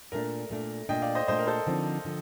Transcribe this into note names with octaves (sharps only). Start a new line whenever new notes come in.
A#2 A3 D4 A#4
A#2 A3 D4
A#2 A3 D4 D#5 G5
D5 F5
C5 D#5
A#2 A3 D4 C5 D#5
A#4
A4 C5
D3 F3 C4 D#4
D3 F3